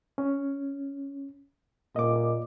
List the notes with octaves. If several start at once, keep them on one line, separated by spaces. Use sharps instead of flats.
C#4
A#2 D#5 D6